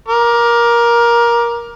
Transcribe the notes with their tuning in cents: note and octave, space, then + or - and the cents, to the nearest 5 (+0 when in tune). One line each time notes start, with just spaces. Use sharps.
A#4 +20 D6 +0